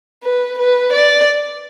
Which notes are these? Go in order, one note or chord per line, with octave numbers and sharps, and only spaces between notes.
B4
B4
D5